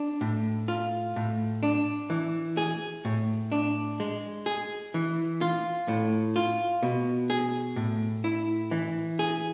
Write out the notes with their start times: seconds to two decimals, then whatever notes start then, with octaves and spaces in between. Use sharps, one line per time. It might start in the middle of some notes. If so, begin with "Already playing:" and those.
Already playing: D4
0.21 A2
0.68 F4
1.16 A2
1.63 D4
2.10 E3
2.57 G#4
3.05 A2
3.52 D4
4.00 G#3
4.46 G#4
4.94 E3
5.41 F4
5.88 A2
6.36 F4
6.83 B2
7.30 G#4
7.76 A2
8.24 E4
8.71 E3
9.19 G#4